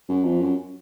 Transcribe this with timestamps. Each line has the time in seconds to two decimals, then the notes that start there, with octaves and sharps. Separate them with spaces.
0.09 F#2
0.25 F2
0.41 F#2